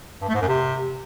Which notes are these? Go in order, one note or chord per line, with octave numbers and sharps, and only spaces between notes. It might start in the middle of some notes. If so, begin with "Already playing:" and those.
G2
A3
G#2
F#2
C3